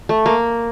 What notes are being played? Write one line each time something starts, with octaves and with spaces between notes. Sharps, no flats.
A3
A#3